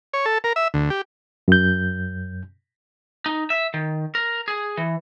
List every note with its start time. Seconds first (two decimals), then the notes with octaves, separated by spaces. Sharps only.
0.13 C#5
0.26 A4
0.44 A#4
0.56 E5
0.74 D2
0.90 G4
1.48 F#2 G6
3.26 D#4
3.50 E5
3.74 D#3
4.15 A#4
4.48 G#4
4.77 E3